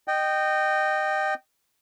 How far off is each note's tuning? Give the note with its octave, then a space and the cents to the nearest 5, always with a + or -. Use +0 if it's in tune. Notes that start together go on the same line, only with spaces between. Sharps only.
D#5 -20 G5 -10